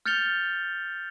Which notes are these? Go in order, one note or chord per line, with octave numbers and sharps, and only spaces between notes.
F6 G6 A6 C#7 F7 G7